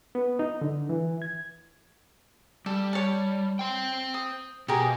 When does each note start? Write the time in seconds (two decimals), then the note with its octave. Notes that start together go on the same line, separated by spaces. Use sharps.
0.15 B3
0.39 D#4
0.61 D3
0.89 E3
1.22 G#6
2.66 G3 A4
2.93 C#5 A5
3.59 C5 G5
4.14 D#6
4.68 B2 G4 G#4 A#4